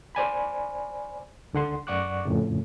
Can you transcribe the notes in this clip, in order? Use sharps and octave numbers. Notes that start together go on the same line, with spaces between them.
C5 D5 G#5 B5
C#2 D3 F#5 C6
F#2 D5 F#5 C#6 D6 F#6
F2 A2 C#3